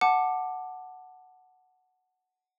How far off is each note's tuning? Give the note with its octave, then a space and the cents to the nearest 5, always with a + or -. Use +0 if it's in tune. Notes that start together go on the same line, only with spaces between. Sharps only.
F#5 +0 A5 +0 D6 +15